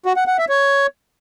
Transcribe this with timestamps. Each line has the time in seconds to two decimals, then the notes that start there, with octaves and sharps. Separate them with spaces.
0.06 F#4
0.16 F#5
0.27 F#5
0.38 E5
0.49 C#5